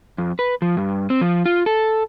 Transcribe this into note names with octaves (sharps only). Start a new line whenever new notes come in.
F2
B4
F3
G2
C4
F3
F4
A4